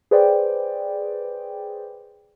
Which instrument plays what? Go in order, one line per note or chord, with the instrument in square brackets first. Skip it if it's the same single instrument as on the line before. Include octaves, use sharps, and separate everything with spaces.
[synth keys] G#4 B4 C5 D5 G5